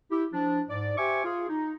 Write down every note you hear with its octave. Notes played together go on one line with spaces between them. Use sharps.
E4 G4
F3 D4
G#2 D5
G4 C5 E5 G#5 C#6 D6
F4 G#4
D#4